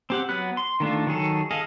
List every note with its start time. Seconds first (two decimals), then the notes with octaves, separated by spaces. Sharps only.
0.10 C4 G4 F#5
0.29 F#3 B3 F#6
0.57 C6
0.80 D#3 A3 D4 F4
1.07 D#3 F#3 G#4 A4
1.51 G#4 A4 D#5 F5